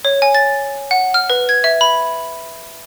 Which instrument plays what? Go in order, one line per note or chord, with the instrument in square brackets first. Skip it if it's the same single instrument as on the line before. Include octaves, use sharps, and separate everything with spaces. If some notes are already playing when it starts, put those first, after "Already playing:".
[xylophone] C#5
G#5
A6
F#5
F6
B4
G#6
E5
B5